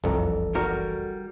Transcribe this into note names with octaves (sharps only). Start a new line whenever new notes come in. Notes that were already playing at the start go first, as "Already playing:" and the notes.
F#1 C2 F2 E3 A4 A#5
G3 F#4 A#4